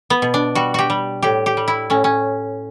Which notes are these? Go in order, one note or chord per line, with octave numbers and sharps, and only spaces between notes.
B3
B2
D4
G3 F#4
F#4 G4
G3
A2 G4
G4
G3
E4
A2 C#4
C#4